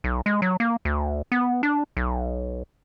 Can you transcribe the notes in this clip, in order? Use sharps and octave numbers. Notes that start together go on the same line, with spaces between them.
B1
G#3
F#3
A#3
D2
B3
D4
B1